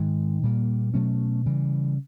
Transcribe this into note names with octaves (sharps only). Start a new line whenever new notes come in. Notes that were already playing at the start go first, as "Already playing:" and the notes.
Already playing: G#2 D#3 G#3
A#2 G3 A#3
B2 F#3 A3 C#4
C#3 E3 G3